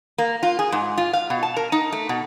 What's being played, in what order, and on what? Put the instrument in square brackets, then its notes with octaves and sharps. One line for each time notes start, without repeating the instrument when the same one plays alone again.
[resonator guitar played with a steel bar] A#3
F4
G#4
G#2
F4
F5
B2
A5
A#4
D#4
A3
B2